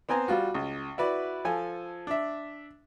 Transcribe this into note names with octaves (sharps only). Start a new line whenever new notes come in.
B3 C4 C5 G#5 A#5
G3 F4 F#4
C#2
E4 F#4 B4 D5
F3 A4 G#5
D4 E5